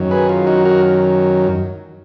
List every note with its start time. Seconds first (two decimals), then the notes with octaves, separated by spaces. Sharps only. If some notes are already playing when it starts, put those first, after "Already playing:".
Already playing: F#2 D#3 F#3
0.11 G#4 B4
0.29 F4
0.47 D#4 F#4
0.65 F#4 A#4